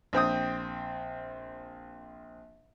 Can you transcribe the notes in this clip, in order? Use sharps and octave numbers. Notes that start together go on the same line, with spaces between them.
A#1 C4 G5 D#6